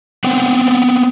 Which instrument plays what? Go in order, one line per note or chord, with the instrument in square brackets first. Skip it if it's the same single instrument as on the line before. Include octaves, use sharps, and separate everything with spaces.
[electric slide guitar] B3 C4 F#5 G5